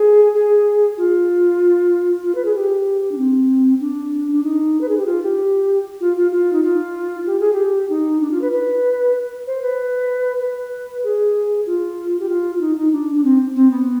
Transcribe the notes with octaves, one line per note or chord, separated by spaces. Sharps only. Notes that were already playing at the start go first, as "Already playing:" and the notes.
Already playing: G#4
G#4
F4
F4
B4
G#4
G4
D4
C4
D4
D4
D#4
B4
G#4
G4
F4
G4
F4
F4
F4
D#4
F4
G4
G#4
G4
D#4
D4
F4
B4
B4
C5
B4
B4
G#4
F4
G4
F4
F4
D#4
D#4
D4
D4
C4
C4
B3